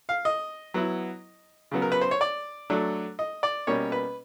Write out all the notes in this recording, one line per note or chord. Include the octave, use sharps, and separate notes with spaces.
F5
D#5
F#3 B3 E4
C#3 F#3 B3
A#4
B4
C5
C#5
D5
F#3 A3 D4
D#5
D5
B2 G3 A#3 C#4 C#5
B4